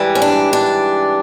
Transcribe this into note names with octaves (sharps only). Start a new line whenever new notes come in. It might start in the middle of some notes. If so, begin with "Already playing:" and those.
Already playing: G#2 E3 G3
C#4
D4
D4